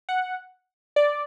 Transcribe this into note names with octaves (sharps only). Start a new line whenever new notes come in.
F#5
D5